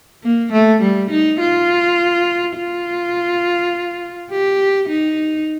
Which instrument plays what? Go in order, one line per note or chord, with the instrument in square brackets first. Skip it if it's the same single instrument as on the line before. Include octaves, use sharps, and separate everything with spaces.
[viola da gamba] A#3
A3
G3
D#4
F4
F4
G4
D#4